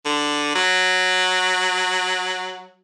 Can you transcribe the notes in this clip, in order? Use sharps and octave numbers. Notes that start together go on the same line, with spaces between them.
D3
F#3